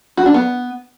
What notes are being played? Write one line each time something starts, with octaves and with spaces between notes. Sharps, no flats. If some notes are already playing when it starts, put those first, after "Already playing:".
F#4
D4
B3